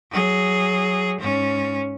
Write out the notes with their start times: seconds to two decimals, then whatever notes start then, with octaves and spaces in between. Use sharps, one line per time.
0.11 F#3 G#4
1.20 G#2 C#4